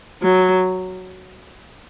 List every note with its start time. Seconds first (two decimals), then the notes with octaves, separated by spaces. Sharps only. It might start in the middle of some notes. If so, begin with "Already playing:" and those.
0.22 F#3